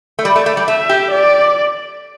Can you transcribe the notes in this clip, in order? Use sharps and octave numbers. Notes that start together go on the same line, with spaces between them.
A3
G3 D5
A3
A3
G3
A3 E5
G4
D5